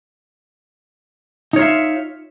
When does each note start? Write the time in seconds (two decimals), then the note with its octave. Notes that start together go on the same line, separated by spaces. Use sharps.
1.53 D#4
1.56 C#5
1.59 F4
1.62 E5